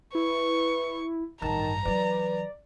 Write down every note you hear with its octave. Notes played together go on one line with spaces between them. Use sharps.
E4 B4 C#6
A1 G2 D#3 A5 A#5
E3 F#3 B4 D5